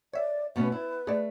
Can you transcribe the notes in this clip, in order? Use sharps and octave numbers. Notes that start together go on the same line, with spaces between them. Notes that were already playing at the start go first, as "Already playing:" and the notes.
C#5 D5 E5
B2 A3 C#4 B4
E4
A3 G#4 D5